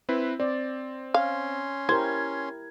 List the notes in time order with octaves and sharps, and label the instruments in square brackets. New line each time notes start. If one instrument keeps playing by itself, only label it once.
[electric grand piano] C4 E4 B4
[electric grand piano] C4 [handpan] D5
[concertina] C#4 C6 [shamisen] F5
[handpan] E4 G4 A#4 [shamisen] C5 [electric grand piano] G#6